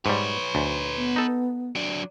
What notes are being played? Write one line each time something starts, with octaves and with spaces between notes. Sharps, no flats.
G#2 G3 B4 C#5
D2
B3
D#4 A4
F#3 D4